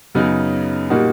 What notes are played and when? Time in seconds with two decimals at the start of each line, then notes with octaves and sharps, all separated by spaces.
0.15 F#2 C#3 F#3 B3 D#4
0.90 A#2 G3 A#3 D#4 F#4